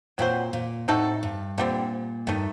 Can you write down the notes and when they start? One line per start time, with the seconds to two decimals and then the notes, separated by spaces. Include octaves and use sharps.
0.18 A#2 F#3 C4 F#4 C5
0.53 A#2
0.88 A2 C4 D#4 F#4 A4
1.23 G2
1.58 A#2 D3 G3 C4
2.27 G2 D#3 A3 D#4